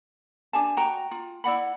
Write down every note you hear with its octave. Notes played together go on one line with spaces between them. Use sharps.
D4 G4 G#5 A5
F#4 G5 A#5
F4
E4 D5 F#5 B5